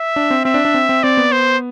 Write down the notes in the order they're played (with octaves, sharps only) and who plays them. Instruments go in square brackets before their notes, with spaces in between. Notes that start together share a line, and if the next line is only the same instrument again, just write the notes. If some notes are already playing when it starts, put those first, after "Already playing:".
Already playing: [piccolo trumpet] E5
[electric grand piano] D4
C4
[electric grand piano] C4 [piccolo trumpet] E5
[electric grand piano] D4
D4
C4
C4
[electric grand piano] C4 [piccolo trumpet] D5
[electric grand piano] B3
[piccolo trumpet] C5